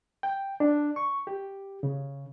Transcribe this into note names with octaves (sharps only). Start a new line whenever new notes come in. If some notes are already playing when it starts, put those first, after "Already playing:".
G5
D4
C#6
G4
C#3